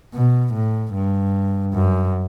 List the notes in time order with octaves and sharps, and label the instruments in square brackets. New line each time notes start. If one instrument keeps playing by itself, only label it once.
[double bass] B2
A2
G2
F#2